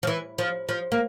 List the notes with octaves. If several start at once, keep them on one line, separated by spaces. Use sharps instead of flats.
F3
E3
F3
F3
A#3